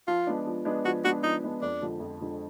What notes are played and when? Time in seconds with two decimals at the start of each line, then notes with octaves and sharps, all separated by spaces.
0.07 F3 F4
0.27 G#3 B3 D4
0.46 F3
0.65 G#3 B3 D4
0.85 F3 F#4
1.04 G#3 B3 D4 F#4
1.23 F3 D#4
1.43 G#3 B3 D4
1.62 F2 D4
1.82 D3 F3 G#3
2.00 F2
2.20 D3 F3 G#3